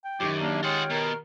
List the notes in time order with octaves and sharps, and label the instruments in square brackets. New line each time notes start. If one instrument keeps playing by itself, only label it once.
[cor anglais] G5
[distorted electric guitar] F#2 [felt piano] D#3 G4 [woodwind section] D6
[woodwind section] A#3 [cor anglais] D4
[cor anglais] G#3 [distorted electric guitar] F4 F#5 [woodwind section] C#5 G5 F6
[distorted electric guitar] B2 [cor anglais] A#4